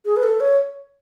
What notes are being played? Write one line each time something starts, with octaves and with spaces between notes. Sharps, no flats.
G#4
B4
A4
C#5